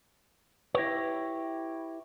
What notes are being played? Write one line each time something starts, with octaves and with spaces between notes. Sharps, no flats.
E4 G4 B4 C#5 A#6